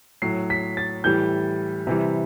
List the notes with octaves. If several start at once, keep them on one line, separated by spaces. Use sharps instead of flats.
A2 F#3 C7
B6
A6
A2 E3 G3 G6
C3 E3 G3